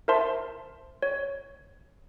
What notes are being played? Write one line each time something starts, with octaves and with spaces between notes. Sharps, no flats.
A#4 C5 E5 A5 C6
C#5